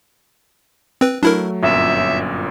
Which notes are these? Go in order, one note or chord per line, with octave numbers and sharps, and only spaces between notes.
C4 B4
F#3 A3 D4 E4 A#4
G1 F#2 A#2 E5